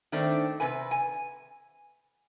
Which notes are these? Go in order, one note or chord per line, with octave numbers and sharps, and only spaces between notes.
D#3 A3 C4 D4
C3 B4 G#5
G#5